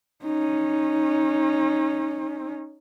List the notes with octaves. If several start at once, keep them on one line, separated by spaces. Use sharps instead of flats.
C#4 D#4